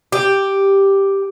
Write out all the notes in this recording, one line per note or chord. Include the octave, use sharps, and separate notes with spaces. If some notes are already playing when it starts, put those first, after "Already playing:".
G4